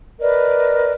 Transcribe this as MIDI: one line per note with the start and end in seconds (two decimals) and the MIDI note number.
0.20 0.93 70
0.20 0.93 71
0.20 0.93 74
0.20 0.93 75